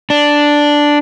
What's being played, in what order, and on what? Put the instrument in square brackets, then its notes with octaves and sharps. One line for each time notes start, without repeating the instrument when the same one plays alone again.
[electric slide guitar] D4